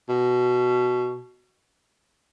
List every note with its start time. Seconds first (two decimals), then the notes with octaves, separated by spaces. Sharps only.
0.09 B2